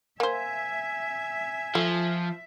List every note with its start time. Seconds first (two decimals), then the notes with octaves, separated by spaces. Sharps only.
0.20 A#3 C5 E5 G#5
1.75 F3 A3